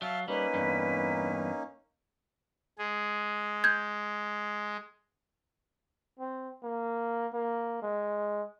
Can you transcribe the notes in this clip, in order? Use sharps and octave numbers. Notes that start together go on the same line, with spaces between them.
F#3 E5 F5 A5 F6
G3 A#3 C#4 D#4 B4
E2 G2
G#3 G#4
G6 G#6
C4
A#3
A#3
G#3